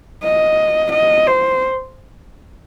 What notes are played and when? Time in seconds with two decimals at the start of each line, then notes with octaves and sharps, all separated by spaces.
0.23 D#5
0.92 D#5
1.27 C5